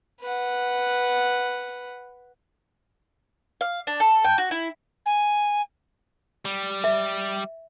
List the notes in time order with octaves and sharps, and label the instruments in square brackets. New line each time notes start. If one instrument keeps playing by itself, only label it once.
[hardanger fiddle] B4 F#5
[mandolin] F5
D4
A4
G5
F#4
E4
[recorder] G#5
[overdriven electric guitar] G3
[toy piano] E5